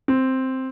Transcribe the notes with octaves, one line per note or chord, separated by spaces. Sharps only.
C4